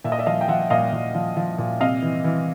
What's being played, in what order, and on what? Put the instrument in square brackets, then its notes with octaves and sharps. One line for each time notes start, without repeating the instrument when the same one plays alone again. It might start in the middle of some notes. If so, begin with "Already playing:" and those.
[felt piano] A#2 E5
D#5
D5 E5
F3 D#5 F5
G5
F3 E5 F#5
A#2 D#5 F5
A#2
F3
F3
A#2
C3 D#5 F5
E3
E3